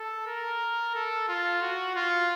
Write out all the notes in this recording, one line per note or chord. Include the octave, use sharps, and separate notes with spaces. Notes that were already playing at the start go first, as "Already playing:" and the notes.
Already playing: A4
A#4
A4
F4
F#4
F4